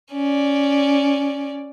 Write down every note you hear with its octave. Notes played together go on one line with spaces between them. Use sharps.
C#4 D5